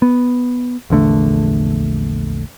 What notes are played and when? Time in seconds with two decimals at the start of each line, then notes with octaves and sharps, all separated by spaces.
0.02 B3
0.90 A#1 E2 D3 A3